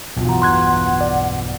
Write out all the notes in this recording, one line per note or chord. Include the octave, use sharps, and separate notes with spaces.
B1 E2 G2 B2 F4
E3 F#5 A#5
C6 F#6 G#6
D5